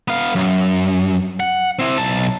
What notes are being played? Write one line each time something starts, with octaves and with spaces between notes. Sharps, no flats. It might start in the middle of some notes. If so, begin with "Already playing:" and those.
B3 F5
F#2
F#5
C4 E4
B1 A5